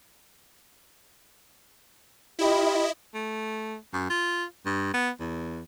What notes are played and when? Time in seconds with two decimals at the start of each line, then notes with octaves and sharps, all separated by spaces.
2.39 E4 F4 G4 D#5 B5
3.14 A3
3.93 F#2
4.10 F4
4.66 G2
4.94 B3
5.20 E2